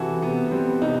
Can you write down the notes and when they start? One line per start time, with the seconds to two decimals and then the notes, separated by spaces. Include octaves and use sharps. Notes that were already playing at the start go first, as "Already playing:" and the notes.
Already playing: C3 E3 E4 F#4 A4
0.22 C3 B3
0.47 B3
0.51 G3 C4
0.82 C3 D#4